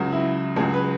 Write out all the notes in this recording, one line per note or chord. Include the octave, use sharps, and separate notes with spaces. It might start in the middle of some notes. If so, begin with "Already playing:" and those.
Already playing: C#2 C#3 F#3
E4
C#2 C#3 F#3 G#4
B4